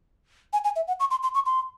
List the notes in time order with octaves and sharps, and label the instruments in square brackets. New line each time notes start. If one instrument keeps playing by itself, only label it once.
[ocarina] G#5
G#5
E5
F#5
C#6
C6
C6
C#6
C6